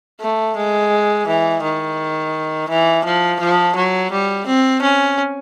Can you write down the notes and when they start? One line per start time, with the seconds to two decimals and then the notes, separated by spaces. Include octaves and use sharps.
0.21 A3
0.56 G#3
1.27 E3
1.63 D#3
2.69 E3
3.05 F3
3.40 F3
3.76 F#3
4.12 G3
4.47 C4
4.82 C#4